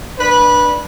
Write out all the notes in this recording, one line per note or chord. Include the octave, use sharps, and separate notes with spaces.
D4 B4